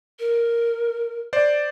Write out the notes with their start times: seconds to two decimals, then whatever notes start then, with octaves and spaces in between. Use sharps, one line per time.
0.19 A#4
1.33 C5 D5